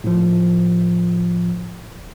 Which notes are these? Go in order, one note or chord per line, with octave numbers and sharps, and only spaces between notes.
A2 F3